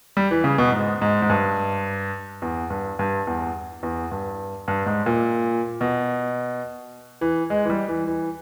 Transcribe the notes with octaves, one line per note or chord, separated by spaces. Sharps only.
G3
E3
C#3
B2
G#2
G#2
G#2
G2
E2
G2
G2
E2
E2
G2
G2
G#2
A#2
B2
E3
G#3
E3
G3
E3
E3